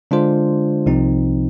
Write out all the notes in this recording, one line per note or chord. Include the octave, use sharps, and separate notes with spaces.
D3 G#3 D4 F4 C5
C2 C3 F3 C4 D#4